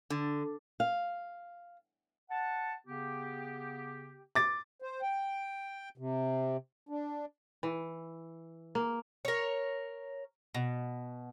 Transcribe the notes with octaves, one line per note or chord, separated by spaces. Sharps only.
D3
F5
F#5 A5
C#3 B3 G4
D6 A6
C5
G5
C3
D4
E3
A#3
A#4 C#5
B2